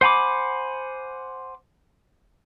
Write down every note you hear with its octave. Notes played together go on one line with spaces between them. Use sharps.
C5 F#5 G#5 B5 D6